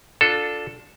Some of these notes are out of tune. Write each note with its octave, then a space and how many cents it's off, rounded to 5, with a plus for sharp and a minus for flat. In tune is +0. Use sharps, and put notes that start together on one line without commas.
D4 +5 F4 +30 A4 +0